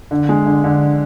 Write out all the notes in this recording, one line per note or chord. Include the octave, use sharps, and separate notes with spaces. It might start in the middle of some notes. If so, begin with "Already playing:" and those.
D3
G#3
D3
D3